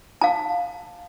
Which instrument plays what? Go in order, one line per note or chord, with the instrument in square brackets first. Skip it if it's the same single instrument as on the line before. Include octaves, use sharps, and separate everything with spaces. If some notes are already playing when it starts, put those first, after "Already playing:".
[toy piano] F5 A5